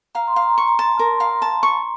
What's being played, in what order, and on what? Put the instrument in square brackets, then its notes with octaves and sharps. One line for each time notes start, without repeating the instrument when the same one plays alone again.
[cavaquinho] F5 [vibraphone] A#5
[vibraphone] C6
[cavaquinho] F5
[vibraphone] A#5
[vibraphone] C6 [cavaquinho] C#6
[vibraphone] A#5
[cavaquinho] A5 [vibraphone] C6
[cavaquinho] A#4 [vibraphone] A#5
[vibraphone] C6
[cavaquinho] F5 [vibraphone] A#5
[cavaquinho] A5
C#6